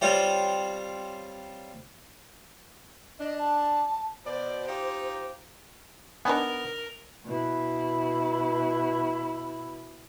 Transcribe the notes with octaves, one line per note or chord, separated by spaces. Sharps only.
G3 C4 F4 C5 C#5
D4 D#5
A5
B2 C5 D5
D#4 F4 G4
B3 D4 D#4 A#4 G#5
B2 E4